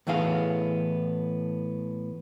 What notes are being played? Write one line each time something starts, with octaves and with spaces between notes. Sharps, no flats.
A2 E3 B3 G#4 F5